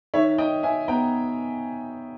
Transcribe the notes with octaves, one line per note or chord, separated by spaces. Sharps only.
D#3 C#5 E5
D#3 D#5 G5
D#3 E5 G#5
B3 G5 A#5